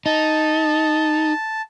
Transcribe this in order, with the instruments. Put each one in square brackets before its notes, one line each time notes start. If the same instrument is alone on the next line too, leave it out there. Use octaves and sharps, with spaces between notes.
[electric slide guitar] D#4 [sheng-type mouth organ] A5